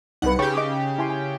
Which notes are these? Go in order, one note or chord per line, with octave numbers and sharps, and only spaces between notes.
C2 D#4 B4 F#5
C#3 G4 G5 C#6
D#5 D6
E4 G#5 C6
G#5